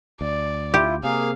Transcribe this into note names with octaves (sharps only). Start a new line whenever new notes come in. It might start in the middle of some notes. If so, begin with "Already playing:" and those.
D2 D5
E4 F4 G4
C3 A#3 G#4 F5